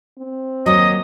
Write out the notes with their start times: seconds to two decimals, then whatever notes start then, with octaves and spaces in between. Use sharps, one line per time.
0.18 C4
0.66 D#2 F#3 D#5 D#6